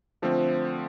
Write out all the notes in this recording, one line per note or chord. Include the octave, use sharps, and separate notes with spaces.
D3 F3 A3 C4